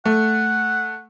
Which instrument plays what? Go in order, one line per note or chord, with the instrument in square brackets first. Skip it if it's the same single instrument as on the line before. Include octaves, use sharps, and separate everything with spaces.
[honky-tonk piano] A3 [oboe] F#5